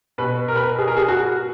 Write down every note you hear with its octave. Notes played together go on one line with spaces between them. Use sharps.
B2 B4
A#4
B4
A#4
G#4
A#4
G#4
F#4